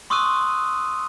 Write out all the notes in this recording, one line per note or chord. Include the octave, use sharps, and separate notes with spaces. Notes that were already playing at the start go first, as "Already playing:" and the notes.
C6 C#6 D#6 E6 F#6 D#7